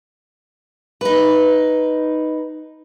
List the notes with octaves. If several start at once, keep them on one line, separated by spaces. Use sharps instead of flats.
D#4 B4